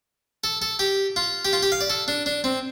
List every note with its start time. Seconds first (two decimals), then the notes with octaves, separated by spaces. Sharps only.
0.44 A4
0.62 A4
0.79 G4
1.16 F4
1.45 G4
1.53 F4
1.63 G4
1.72 F5
1.81 D5
1.90 A4
2.08 D4
2.26 D4
2.44 C4